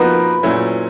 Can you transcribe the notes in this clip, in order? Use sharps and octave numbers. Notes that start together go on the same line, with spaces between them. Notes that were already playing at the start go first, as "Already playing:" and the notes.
Already playing: F3 A#3 D#4 F#4 A#4 B4
A#2 F#3 A3 C#4 E4